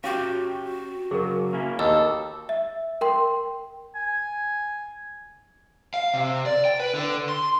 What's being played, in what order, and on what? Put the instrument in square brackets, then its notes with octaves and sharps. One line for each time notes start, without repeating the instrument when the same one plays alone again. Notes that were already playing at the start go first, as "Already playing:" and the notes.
[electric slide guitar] C#4 G4 G5 [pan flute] F#4 [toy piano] F5
[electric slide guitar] C#3 F#3 [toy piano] G#4 A#4
[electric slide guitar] A#3 C#4 E4
[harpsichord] D#2 [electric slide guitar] A4 [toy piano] B5
[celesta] E5
A#4 G5 C6
[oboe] G#5
[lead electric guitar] F5
C3
D5
G5
B4
D3
C6